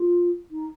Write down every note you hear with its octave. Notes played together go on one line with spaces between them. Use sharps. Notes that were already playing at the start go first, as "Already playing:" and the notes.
Already playing: F4
D#4